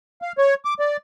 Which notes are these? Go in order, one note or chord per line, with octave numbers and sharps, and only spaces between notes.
F5
C#5
D6
D5